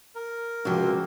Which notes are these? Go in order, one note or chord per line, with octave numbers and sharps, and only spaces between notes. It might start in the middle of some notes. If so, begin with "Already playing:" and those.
A#4
C#2 C3 F3 A#3 C4 F#4